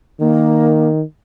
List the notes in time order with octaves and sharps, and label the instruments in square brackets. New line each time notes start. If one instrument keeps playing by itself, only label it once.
[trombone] D#3 [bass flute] A#3